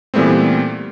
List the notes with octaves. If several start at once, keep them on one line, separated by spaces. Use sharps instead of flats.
A#2 E3 G3 A3 B3 C4